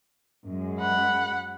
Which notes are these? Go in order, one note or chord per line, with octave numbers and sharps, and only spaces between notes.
F#2 G#3
F#5 B5